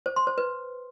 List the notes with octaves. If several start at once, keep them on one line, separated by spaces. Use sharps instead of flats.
C5
C6
C5
B4